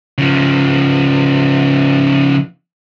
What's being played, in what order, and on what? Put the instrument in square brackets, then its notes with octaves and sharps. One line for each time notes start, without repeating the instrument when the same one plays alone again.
[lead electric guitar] C#3 F3